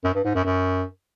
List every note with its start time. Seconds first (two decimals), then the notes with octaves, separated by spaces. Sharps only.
0.04 F#2
0.14 G2
0.24 G#2
0.35 F#2
0.45 F#2